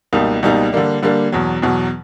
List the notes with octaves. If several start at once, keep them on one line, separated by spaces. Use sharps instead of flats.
C#2 B2 G3 A#3 D#4
C#2 B2 G3 A#3 D#4
D3 G3 A#3 D4
D3 G3 A#3 D4
E2 B2 F#3
E2 B2 F#3